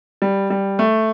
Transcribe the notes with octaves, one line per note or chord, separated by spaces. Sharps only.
G3
G3
A3